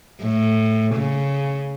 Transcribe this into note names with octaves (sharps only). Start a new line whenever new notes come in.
A2
C#3